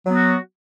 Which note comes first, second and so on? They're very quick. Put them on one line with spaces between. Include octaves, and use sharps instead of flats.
F#3 B3 F#4